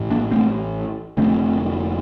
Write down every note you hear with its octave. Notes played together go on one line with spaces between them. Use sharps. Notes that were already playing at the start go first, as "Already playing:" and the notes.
Already playing: A1 A2
A#3 D4
A3 C4
F1 F2 D3 A3 C4